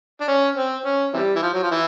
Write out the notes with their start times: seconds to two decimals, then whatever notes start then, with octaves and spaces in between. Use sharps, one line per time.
0.21 D4
0.28 C#4
0.56 C4
0.85 C#4
1.13 C3 E3 G3
1.36 E3
1.42 F3
1.54 F#3
1.63 F3
1.71 E3